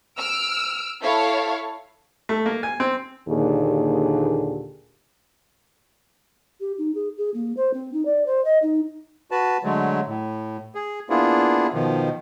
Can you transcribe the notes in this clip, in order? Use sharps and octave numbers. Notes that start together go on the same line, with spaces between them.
E6 F6 D7
E4 A4 C#5 F5
A3
A#3
G#5
C4
D#2 A#2 D3 G4 G#4
G4
D#4
G#4
G#4
A#3
C5
C4
D#4
D5
C5
D#5
D#4
F#4 B4 A5
D3 F#3 G#3 A3
A2
G#4
A#3 B3 D4 E4 F4 G#4
B2 D#3 F3